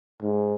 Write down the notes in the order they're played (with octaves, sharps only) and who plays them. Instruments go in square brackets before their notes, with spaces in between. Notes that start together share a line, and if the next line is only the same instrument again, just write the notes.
[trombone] G#2